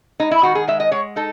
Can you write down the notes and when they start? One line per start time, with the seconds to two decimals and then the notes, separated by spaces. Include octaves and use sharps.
0.20 G#3 D#4
0.31 E4
0.43 D#3 F#4
0.55 G#4
0.68 G#3 E5
0.80 D#5
0.91 G#3 C#5
1.16 D#4 A4